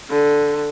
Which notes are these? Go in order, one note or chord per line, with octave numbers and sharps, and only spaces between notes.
D3